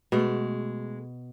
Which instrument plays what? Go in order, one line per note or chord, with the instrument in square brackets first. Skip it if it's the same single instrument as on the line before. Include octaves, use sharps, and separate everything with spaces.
[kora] B2 [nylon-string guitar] G#3 A3